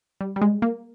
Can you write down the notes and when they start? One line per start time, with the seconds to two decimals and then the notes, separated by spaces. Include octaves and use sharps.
0.21 G3
0.36 G3
0.42 G#3
0.62 A#3